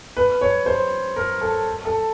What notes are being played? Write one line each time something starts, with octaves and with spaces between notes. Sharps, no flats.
B4
C#5
C5
A#4
A4
A4